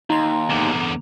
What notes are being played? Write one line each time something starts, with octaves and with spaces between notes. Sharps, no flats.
D#2 D#4 A#5 C6
E2 D3